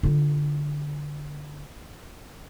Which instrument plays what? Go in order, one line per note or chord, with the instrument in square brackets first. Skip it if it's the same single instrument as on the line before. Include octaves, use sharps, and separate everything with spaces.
[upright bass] D3 F4